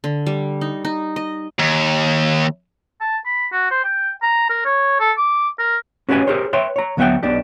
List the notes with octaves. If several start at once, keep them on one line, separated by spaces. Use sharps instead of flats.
D3
G3
D#4
D#4
D#5
D#2
A5
B5
F#4
C5
G5
A#5
A#4
C#5
A4
D6
A#4
C#4 F#4 G4 B4 C#5 G#5
G4 G#4 A#4 C5 C#5
B4 C#5 E5 G5 C6
C#5 A#5
D2 F#3 B3 E5 F#5 G5
B1 B2 D4 G4